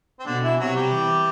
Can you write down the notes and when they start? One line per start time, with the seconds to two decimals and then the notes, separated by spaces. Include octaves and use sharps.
0.19 C4
0.26 B2 D3 D4
0.43 E3 E4
0.60 C3 F#3 F#4
0.76 G3 G4
0.94 E3